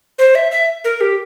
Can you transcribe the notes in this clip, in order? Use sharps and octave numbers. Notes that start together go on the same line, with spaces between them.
C5
E5
E5
A#4
G4